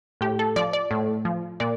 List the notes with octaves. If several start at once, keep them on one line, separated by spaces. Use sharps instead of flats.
A2 G4
A4
F3 D5
D5
A2
F3
A#2 D5